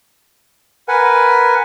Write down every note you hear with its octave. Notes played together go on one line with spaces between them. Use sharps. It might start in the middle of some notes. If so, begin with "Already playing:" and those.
A#4 B4 F#5 G#5